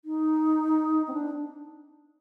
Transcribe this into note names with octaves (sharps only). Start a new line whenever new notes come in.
D#4
C4
D4